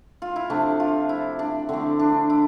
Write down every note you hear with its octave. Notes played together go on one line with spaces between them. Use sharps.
F4
E4
C3 F3 A3 D4
F4
E4
D4
D3 A3 C4
D4
E4